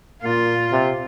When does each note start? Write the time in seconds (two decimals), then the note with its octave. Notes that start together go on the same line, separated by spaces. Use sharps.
0.23 A#2 A#3 F4
0.72 C3